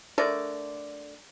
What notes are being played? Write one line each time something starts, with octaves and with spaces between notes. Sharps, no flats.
D3 A3 A#4 D5